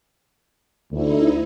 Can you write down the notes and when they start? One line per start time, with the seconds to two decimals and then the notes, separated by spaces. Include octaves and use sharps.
0.92 D2 D#4 E4